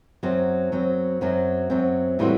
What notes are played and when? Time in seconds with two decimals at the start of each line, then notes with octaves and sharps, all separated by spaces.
0.23 F#2 F#3 C4
0.72 F#2 F#3 C4
1.21 F#2 F#3 C4
1.70 F#2 F#3 C4
2.19 A2 E3 G3 C4 F#4